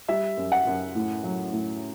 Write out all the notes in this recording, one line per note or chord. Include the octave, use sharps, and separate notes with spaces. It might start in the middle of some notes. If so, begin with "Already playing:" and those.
G3 E5
F#2
F#5
F#2
A2
F#3
A2